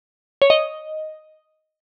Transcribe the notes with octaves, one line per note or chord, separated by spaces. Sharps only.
C#5
D#5